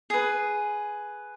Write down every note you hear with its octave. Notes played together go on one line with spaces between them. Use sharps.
G#4 B4